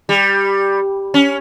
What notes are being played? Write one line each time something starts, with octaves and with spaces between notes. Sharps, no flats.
G3
C#4